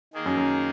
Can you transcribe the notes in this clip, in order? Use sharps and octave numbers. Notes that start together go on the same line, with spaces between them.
D#3 A#3 D#4 G#4
F#2
F#2